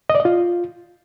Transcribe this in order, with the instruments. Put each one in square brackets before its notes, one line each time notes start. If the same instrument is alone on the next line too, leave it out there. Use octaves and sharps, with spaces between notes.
[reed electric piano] D#5
D5
D#5
F4